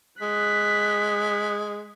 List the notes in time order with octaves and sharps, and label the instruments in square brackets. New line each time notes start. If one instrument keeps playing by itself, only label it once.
[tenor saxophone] G#3 [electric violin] F#6 B6